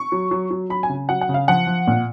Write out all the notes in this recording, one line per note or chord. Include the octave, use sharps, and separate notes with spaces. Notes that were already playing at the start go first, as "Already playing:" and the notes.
Already playing: C#6
F#3
F#3
F#3
F#3 B5
G#5
C#3
F#3 F#5
F#5
C#3
F5
F3 F#5
F3
A#2